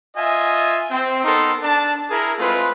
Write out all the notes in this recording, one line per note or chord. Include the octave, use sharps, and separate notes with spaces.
F4 D#5 E5 G#5
C4
B3 D#4 A4 A#4 C6
D4 A5
E4 G#4 A#4
G#3 A3 C4 F4 B4